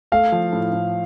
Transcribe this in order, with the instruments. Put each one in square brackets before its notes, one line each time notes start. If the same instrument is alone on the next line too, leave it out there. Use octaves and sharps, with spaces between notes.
[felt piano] A3 [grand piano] F5
[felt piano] F3
A2
A2